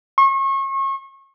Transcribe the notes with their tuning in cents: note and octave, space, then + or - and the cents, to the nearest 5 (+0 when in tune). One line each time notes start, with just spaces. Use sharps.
C#6 -35